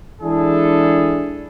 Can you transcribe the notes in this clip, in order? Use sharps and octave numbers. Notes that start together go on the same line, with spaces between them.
E3 G#3 D4 E4 G#4 A4